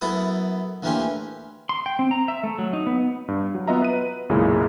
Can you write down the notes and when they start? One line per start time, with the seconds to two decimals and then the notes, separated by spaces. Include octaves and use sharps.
0.01 F#2 B3 E4 A4 B4 D#6
0.82 D2 E3 A#3 C#4 G4 C6
1.69 C6
1.86 G5
1.99 C4
2.11 A#5
2.28 E5
2.44 A3
2.58 F#3
2.73 D#4
2.87 B3
3.00 B3
3.28 G2
3.55 F#3
3.68 B3 F4 D#5 E5 A#5
3.82 B4 D#7
4.29 B1 F#2 A#2 C#3 G#3 E4